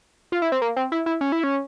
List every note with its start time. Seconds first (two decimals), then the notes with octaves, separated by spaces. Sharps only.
0.32 F4
0.42 E4
0.52 C4
0.62 A#3
0.76 C4
0.92 E4
1.06 E4
1.21 C#4
1.32 E4
1.44 C#4